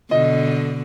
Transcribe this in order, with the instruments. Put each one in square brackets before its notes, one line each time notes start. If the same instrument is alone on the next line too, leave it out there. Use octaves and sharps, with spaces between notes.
[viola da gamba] B2 D3 [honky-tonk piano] D#5